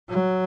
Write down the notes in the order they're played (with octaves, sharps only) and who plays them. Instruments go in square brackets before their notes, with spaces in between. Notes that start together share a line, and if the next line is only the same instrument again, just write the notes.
[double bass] F#3